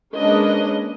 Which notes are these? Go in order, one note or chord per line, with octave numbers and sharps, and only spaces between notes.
G#3 A#3 C#4 D4 B4 D#5